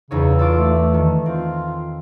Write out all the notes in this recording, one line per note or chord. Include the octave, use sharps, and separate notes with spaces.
E2 C#3 D#4 C#5
F4 A4 A5 D6
A3
D#3
C4 F4